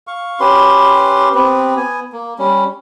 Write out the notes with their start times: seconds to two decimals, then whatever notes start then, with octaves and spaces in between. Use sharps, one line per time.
0.07 F5 C#6
0.40 C#4 G4 B4 C6
1.34 B3 C4 G4 B4
1.77 B3 G#5
2.12 A#3
2.39 G3 C#4